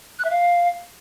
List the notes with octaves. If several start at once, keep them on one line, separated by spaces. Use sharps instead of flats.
F#6
E5
F5